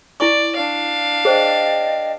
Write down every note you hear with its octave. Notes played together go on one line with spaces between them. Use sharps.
E4 D5 G#5 C#6
D4 F5
G#4 C5 D5 D#5 G5